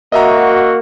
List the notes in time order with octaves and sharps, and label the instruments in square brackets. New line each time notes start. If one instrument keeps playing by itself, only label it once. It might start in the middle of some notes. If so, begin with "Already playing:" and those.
[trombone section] A#3 F#4 [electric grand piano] D#5 E5 A#5